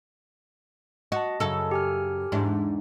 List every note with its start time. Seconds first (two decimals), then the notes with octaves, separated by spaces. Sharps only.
1.12 F#4 D#5 A5
1.40 F#2 C#3 A4
1.71 G4 G#5 F6
2.32 E2 G#2 D4